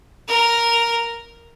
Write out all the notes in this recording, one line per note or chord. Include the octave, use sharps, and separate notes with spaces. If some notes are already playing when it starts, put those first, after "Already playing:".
A#4